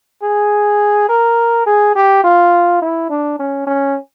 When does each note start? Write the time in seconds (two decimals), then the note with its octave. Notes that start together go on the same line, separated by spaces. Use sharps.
0.23 G#4
1.09 A#4
1.67 G#4
1.95 G4
2.24 F4
2.82 E4
3.10 D4
3.39 C#4
3.67 C#4